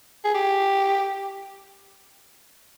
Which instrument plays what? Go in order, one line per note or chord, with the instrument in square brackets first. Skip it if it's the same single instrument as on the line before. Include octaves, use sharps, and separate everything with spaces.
[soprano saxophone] G#4
G4